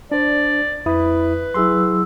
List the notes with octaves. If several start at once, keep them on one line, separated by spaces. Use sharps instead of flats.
D4 C5 D5
F2 E4 B4 D#6
F#3 E4 G#4 C6 E6